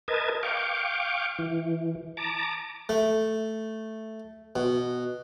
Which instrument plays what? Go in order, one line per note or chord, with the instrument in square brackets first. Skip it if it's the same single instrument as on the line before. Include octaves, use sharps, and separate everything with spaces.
[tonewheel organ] A#4 B4 D#5 A5 G#6
F5 G5 C#6 D6
E3
A5 A#5 D6
[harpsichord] A3
B2